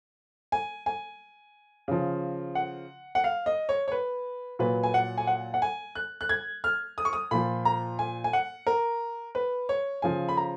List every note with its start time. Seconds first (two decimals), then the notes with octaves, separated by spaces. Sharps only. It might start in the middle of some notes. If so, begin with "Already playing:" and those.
0.52 G#5
0.86 G#5
1.88 C#3 F3
2.55 F#5
3.15 F#5
3.24 F5
3.46 D#5
3.69 C#5
3.88 C#5
3.92 B4
4.59 A#2 F#3 B4
4.83 G#5
4.94 F#5
5.18 G#5
5.27 F#5
5.54 F#5
5.62 G#5
5.95 F#6
6.21 F#6
6.29 G#6
6.64 F6
6.98 D#6
7.05 C#6
7.13 D#6
7.31 A#2 F3 B5
7.65 A#5
7.99 G#5
8.24 G#5
8.33 F#5
8.67 A#4
9.35 B4
9.69 C#5
10.02 C#3 F3 G#5
10.29 B5
10.37 A#5